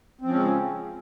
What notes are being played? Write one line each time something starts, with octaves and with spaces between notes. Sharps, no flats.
C#3 F3 G#3 C4 C#4